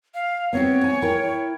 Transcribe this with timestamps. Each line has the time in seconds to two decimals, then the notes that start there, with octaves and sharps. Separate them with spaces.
0.14 F5
0.53 B3 C4 G4 C#5
0.84 G#5
1.02 E4 A#4 G5